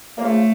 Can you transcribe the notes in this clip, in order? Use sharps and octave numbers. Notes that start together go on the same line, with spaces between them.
A#3
C#3 F3 A3